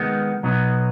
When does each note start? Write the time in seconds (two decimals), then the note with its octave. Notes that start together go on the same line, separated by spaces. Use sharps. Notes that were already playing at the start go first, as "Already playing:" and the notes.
Already playing: D#3 G#3 B3
0.43 B2 F#3 B3 D#4